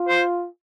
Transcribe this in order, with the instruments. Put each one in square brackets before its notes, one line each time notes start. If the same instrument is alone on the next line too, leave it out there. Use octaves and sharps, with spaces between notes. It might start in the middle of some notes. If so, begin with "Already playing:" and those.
Already playing: [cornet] F4
[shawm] C5